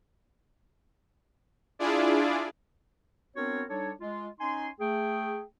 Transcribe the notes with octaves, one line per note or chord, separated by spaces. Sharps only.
D4 E4 F4 G#4 D5
B3 C4 D4 F#4 A#4 C#5
G3 D4 D#4 A4 C#5
G#3 F4
C#4 D#4 G#5 C6
A3 G#4 G5